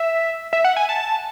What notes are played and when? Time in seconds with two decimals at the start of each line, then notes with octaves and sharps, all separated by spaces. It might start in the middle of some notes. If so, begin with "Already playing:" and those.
Already playing: E5
0.53 E5
0.64 F#5
0.77 G#5
0.89 A5